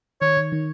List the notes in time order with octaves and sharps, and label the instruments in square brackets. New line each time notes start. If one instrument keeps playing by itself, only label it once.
[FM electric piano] D#3 [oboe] C#5
[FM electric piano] D#3
D#3